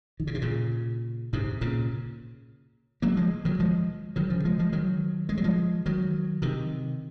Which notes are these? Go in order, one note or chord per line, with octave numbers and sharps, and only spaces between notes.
D#3
C#3
C3
A#2 C#3
G#2 C3
A#2 C#3
F#3 A#3
F3 G#3
D#3 F#3
F3 G#3
D#3 F#3
C#3 F3
F3 G#3
F3 G#3
D#3 F#3
G#3
F#3
F3 G#3
D#3 F#3
C3 D#3